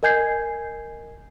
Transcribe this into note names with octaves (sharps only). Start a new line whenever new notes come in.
A#4 D#5 G#5 G6 G#6 C7